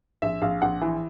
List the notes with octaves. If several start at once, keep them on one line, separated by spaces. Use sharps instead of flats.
A#1 E5
A#1 F5
A#1 F#5
E3